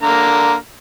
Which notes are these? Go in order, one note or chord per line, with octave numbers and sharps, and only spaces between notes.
D3 A#3 A#5